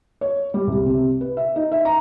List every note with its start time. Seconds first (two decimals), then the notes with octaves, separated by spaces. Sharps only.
0.21 C#5
0.54 G3
0.67 C2
0.86 C3
1.21 B4
1.37 E5
1.56 D#4
1.72 E5
1.85 A#5